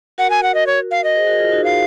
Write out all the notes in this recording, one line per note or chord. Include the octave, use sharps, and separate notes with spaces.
F#4 A#4 F#5
G#5
F#5
D#5
C#5
F5
D#5
G#4 C5
F#4 A#4
F4 G#4
D#4 F#4
D#4 F5